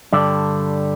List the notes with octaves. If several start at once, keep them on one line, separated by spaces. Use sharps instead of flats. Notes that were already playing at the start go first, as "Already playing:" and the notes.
G2 D3 G3 D4